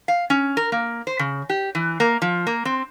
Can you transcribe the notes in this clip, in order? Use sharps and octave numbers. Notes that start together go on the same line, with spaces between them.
F5
C#4
A#4
A#3
C5
C#3
G4
E3
A#3
F3
A#3
C4